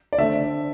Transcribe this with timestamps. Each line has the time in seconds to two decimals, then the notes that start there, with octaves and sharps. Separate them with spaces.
0.13 D5
0.18 D3 A3 C4 E5